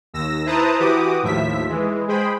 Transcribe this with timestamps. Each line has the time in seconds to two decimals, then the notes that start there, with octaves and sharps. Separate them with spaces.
0.14 D#2 E6 A#6
0.46 E4 B4 C5 A5 A#5 D#6
0.80 E3 F#4 G4 D6 D#6
1.22 D#2 A2 F3 E5 B6
1.69 E3 G#3
2.08 G#3 G#4 C5 G5 B5